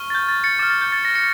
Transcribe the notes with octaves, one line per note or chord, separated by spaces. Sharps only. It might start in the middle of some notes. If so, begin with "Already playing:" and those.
Already playing: C#6 F6
A6
G6
A6
A6 C#7
D6 F6 A6
A6
G6
A6
A#6
C#7